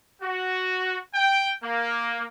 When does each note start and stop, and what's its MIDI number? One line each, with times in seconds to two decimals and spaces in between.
0.22 0.97 66
1.14 1.50 79
1.62 2.24 58